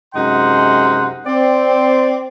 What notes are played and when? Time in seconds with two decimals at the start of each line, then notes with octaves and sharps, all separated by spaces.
0.15 F#2 C3 G#3 D#4 F#5 C6
1.26 C4 D5